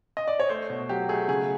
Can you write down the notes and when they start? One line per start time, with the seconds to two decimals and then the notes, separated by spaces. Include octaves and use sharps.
0.17 D#5
0.28 D5
0.40 C#5
0.49 A3 C5
0.70 B2
0.89 F#3 G4
1.09 A3 G#4
1.28 C#3 G#4